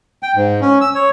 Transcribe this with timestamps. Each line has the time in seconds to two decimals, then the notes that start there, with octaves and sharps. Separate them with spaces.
0.23 G5
0.35 G#2
0.61 C#4
0.81 E6
0.95 C#5